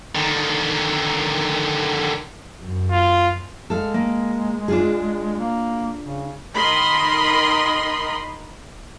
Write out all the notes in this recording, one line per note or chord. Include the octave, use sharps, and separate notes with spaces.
D3 D#3
F#2
F4
G#3 A4 F5
A#3
D4 F4 G#4
A#3
C#3
D#3 A#4 D#5 B5 C6